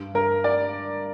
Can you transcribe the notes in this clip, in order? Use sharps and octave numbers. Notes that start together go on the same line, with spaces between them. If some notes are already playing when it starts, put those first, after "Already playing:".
Already playing: G2
G2 A#4
D5